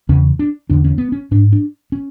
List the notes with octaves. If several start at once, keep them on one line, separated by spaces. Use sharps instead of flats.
E2 C#3 C#4
D4
E2 D3 D4
C#4
B3
C#4
G#2 D4
D4
C#4